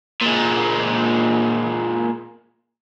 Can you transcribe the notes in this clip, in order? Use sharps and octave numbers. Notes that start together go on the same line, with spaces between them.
A#2 G#3